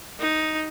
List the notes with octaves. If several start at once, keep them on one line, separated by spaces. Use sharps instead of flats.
D#4